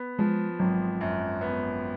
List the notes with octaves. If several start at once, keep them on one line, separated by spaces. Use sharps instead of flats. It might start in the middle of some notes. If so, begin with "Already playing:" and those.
Already playing: B3
F3 G#3
G#1 F#3
F#2
B3